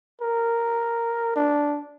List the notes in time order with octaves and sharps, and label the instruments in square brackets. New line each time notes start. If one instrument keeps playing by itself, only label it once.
[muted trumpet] A#4
D4